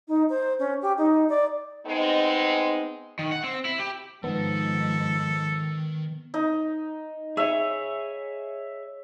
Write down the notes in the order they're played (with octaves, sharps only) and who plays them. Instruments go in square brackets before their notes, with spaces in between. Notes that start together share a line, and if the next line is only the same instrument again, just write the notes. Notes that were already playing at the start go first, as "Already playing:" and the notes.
[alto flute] D#4
C5
C#4
G4
D#4
D5
[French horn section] G#3 B3 C4 D#4
[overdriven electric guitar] D#3
F#5
C4
E4
G4
[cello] G#2 F3 [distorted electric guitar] D#3 [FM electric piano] B3 [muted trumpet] A4
[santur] D#4
[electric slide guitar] G#4 C#5 [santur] E5